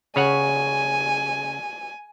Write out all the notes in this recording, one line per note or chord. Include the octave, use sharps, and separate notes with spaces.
C#3 C#5 F#5 G#5